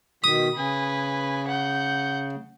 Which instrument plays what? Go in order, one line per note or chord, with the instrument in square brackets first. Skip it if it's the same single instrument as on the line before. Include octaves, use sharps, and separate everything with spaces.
[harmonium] B2 D#3 [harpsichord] D#6 [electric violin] B6
[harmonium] C#3 [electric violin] B4 G#5
[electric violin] F#5 G6